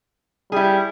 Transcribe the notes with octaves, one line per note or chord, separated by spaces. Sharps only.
G3 E4 G#4